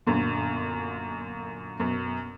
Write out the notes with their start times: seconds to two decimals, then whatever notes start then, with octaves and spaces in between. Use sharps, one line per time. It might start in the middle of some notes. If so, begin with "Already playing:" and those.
0.07 G1 F#2 A#2 D3
1.80 F#2 B2